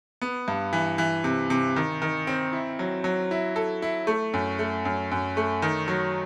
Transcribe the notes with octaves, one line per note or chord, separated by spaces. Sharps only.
B3
G2
E3
E3
C3
C3
D#3
D#3
C4
E4
F#3
F#3
E4
A4
E4
A3
F#2
A3
F#2
F#2
A3
D#3
F#3